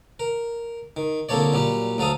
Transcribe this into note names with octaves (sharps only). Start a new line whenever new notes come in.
A#4
D#3
C2 D3 A#3 A4 C#5 D5
A#2 F#3 G3 G4
D2 F#3 A4 F5 D#6